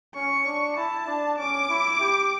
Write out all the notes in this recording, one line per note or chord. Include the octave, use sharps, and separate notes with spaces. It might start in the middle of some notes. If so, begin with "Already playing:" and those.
C#4 C#6
D4
E4 A5
D4
C#4 D6
E4
G4